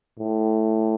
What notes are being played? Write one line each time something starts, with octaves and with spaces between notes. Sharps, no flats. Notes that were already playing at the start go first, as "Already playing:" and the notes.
A2